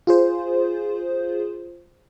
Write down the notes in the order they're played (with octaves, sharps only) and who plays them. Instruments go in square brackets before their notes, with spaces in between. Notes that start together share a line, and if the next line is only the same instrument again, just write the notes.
[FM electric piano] F4 G#4 C5